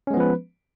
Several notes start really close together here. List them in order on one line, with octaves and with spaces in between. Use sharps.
C#4 G#3 B3 F3 B4